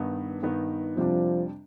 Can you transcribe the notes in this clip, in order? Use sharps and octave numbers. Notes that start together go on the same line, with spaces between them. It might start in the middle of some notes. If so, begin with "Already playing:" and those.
Already playing: G2 D#3 B3 D#4
G2 D#3 B3 D#4
F2 C3 F3 G3 D4